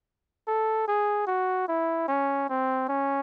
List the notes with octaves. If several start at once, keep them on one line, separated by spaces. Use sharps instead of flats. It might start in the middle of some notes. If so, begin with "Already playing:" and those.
A4
G#4
F#4
E4
C#4
C4
C#4